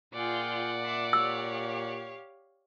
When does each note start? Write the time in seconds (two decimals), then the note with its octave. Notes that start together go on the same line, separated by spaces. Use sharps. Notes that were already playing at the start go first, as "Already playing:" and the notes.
0.14 A#2 F4 G#4 D5 F#5 G5
0.83 E5 C6 D6
1.13 G4 C#5 F5 E6